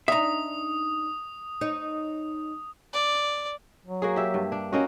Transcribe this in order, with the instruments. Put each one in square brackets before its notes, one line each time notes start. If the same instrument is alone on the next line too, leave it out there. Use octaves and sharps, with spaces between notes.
[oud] D4 D#4 [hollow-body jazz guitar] E5 A#5 [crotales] D#6
[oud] D#4 C#5
[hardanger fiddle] D5
[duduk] F#3
[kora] A#3 F#4 G#4
G4 E5
G2
D4
[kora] A#3 D#4 F#4 [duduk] C#4